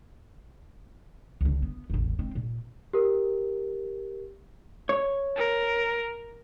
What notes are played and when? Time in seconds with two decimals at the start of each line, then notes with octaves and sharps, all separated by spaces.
1.41 C#2 D3
1.62 B3
1.90 E1 A1
2.19 G#3 C4
2.35 A#2
2.93 G4 A#4
4.89 C#5
5.37 A#4